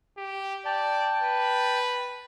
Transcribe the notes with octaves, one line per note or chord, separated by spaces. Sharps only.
G4
D5 G5 A5
B4